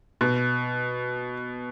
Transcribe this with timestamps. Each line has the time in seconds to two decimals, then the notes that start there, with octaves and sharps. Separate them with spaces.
0.21 B2